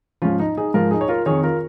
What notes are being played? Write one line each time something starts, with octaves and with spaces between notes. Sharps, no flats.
G#2 F3 C#4 F4
D#4
D#4 G#4
G#2 F3 F4 A#4
D#4 G#4
C#5
F4 A#4
F2 D#3 G#4 C#5
F4 A#4